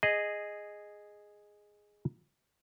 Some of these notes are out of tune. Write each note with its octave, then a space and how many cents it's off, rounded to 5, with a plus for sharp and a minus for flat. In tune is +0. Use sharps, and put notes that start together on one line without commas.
G#4 +0 D#5 -10